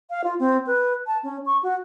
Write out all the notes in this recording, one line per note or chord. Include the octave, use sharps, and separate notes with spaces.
F5
F4
C4
B4
A5
C#4
C#6
F#4